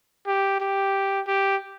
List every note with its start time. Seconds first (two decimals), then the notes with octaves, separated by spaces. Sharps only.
0.27 G4
0.60 G4
1.27 G4